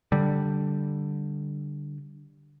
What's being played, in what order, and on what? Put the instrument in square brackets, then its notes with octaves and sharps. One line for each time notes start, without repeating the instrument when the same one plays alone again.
[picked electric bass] D3 G3